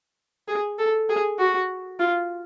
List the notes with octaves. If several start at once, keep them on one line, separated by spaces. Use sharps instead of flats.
G#4
A4
G#4
F#4
F4